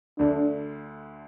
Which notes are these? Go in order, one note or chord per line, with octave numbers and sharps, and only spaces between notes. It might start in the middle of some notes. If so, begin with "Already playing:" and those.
D2 D3 A3 D4